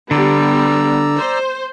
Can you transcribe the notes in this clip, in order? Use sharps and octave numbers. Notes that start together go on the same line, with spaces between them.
D3 G3 B3 D5 A#5 E6
C5